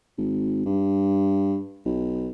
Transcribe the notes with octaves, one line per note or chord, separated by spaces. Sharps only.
G#1
G2
B1